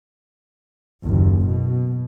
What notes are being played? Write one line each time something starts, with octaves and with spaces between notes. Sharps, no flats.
F#1 D#2
B2